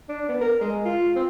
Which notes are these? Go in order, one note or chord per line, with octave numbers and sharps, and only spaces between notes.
D4
B3
A#4
G#3
F4
C4